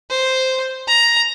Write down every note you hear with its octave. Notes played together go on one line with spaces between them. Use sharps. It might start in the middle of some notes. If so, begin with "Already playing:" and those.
C5
A#5